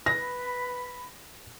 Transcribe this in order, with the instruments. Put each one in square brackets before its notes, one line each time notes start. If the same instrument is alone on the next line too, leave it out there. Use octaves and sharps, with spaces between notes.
[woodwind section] B4 B5 [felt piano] A#6